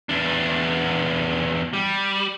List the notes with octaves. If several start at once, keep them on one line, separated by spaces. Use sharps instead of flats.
E2 D4
G3